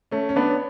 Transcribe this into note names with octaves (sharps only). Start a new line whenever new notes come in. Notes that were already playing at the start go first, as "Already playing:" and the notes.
A3 C#4
C#4
B3 D4